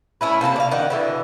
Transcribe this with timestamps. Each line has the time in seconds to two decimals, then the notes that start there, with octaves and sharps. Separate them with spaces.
0.21 A3 C#4 E4 B4
0.41 C3 A#3 A4 A5
0.56 D5 F5
0.71 D#3 D4 F#5
0.90 B2 D3 E3